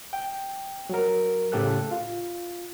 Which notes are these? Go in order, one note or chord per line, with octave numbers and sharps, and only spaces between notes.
G5
F#3 A#4
A2 C#3 G4 A4 F#6
F4